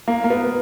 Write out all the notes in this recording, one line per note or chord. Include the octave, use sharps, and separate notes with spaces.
A#3
A#3
B3